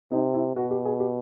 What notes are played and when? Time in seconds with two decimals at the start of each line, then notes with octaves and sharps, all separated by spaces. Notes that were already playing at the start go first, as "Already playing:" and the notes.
0.12 C3 D#4
0.34 E4
0.55 B2 F#4
0.71 G4
0.85 G#4
1.00 G4